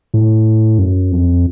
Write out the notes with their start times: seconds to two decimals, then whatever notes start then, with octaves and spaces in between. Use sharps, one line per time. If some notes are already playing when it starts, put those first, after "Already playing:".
0.14 A2
0.79 F#2
1.12 F2